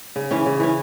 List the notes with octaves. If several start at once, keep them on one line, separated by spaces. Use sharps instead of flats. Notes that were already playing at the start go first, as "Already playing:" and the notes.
C#3
E3 C#4
C#3
E3 C#4